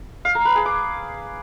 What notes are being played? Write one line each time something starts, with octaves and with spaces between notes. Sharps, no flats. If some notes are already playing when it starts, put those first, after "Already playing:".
F5
A#4
B4
G#4
D6